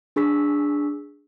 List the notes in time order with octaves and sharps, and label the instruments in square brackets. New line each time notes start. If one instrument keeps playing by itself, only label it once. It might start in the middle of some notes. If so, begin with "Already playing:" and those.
[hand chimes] D4 G#4 C#6 E6 B6